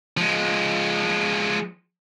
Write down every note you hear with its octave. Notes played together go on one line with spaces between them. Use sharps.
F3 G#3